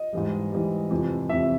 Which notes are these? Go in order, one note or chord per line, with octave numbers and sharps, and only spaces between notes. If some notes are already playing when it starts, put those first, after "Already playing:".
Already playing: D#5
G#2 E3 G3
G#2 E3 G3
F2 C3 E3
F2 C3 E3 E5